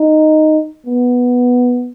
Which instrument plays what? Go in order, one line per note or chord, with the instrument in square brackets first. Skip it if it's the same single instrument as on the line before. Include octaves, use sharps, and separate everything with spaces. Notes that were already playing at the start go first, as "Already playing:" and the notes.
Already playing: [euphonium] D#4
B3